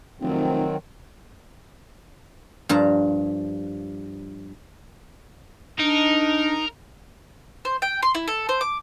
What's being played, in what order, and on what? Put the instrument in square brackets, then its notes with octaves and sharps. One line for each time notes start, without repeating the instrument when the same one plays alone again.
[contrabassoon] F1 [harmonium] D#3 F#3 C4
[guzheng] G2 F3 A5 A#5
[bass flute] D4 [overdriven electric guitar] D#4 [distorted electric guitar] A#4
[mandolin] C5
G5
C6
E4
A4
C5
D6